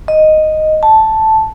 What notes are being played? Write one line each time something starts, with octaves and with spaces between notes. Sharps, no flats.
D#5
A5